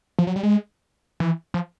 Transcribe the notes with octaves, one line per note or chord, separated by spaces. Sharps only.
F3
F#3
G3
G#3
E3
F3